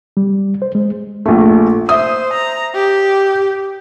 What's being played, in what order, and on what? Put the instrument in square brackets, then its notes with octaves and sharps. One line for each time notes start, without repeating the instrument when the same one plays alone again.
[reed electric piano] G3
C5
G#3
[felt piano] A#1 A3
[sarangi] C5 [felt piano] E5 D#6
[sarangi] A#5
G4